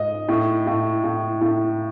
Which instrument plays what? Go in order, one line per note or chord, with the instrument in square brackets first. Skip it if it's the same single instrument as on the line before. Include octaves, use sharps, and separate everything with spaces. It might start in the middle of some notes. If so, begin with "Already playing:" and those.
Already playing: [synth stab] G#2 [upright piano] D#5
[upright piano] A2
A2
A2
A2